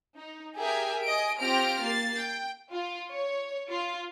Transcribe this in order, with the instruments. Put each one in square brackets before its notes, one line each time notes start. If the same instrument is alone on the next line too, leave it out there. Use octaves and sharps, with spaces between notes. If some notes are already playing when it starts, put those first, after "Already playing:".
[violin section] D#4
G4 G#4 A#4 E5 G5 G#5
D#5 G#5 D7
C4 F4 G4 F6 A#6 D7
A#3 A6 C7
G5
F4
C#5
F4